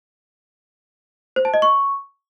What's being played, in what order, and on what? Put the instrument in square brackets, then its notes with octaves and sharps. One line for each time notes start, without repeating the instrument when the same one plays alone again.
[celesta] C5
A5
D#5
C#6